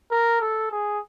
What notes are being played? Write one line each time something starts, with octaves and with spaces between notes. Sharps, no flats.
A#4
A4
G#4